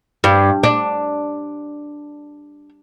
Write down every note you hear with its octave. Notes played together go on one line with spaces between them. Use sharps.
G2
D4